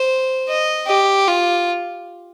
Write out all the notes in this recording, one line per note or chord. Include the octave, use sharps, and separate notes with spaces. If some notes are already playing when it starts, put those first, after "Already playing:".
Already playing: C5
D#5
G4
F4